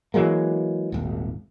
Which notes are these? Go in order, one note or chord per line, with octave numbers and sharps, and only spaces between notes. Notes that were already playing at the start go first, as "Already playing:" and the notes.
E3 F#3 G#3 A#3
D#1 G#1